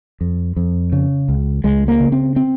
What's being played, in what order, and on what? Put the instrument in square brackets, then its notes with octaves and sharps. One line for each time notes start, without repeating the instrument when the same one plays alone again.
[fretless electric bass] F2
F2
C#3
C#2
C#2 G#3
A#3
C#3
C4
C4